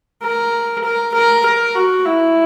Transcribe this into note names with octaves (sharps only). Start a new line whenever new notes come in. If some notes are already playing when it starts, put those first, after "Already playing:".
A#4
A#4
A#4
A#4
F#4
E4